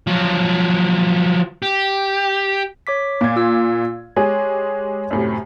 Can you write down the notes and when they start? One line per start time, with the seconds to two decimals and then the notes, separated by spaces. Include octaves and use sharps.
0.07 F3 F#3
1.62 G4
2.87 C#5 D6 B6
3.21 A#2 D6 G#6
3.36 F4 E6
4.17 G#3 G4 G#4 C#5
5.11 F#2 A2 C3